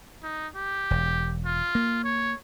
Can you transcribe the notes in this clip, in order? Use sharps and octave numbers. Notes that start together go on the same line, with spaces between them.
D#4
G4
E1
F4
A#3
C#5